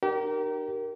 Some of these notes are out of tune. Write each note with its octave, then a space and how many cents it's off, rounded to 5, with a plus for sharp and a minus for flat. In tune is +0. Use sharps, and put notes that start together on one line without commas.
D#4 -45 G4 -30 A#4 +0